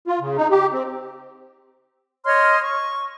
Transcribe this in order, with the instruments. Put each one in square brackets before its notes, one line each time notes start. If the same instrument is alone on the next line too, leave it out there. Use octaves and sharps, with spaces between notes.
[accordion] F4
C#3
D#4
G4
C4
[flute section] C#5 D#5 C6 F6
C#6